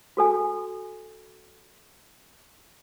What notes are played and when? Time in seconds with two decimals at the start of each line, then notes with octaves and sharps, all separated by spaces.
0.17 F#4 A4 G#5